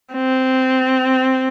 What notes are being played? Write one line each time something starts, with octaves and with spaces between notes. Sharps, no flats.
C4